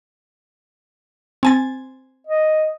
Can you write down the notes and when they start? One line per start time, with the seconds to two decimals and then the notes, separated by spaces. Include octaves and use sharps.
1.43 C4 G#5 A6
2.27 D#5